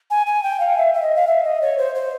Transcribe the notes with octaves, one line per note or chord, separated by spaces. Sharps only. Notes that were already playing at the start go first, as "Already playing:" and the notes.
G#5
G#5
G5
F5
E5
E5
D#5
F5
E5
D#5
C#5
C5
C5